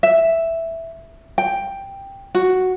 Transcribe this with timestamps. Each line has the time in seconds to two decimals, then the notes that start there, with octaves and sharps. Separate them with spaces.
0.03 E5
1.38 G5
2.35 F#4